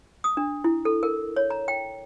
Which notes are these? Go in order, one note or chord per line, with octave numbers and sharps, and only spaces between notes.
D#6
D4
E4
A4
A#4
C#5
A#5
G5